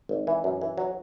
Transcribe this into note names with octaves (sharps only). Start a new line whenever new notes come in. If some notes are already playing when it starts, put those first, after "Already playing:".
G#1
E3
F#2
E3
F#3